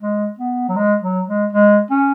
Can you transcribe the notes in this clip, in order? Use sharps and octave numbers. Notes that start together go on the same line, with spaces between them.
G#3
B3
F#3
G#3
F#3
G#3
G#3
C#4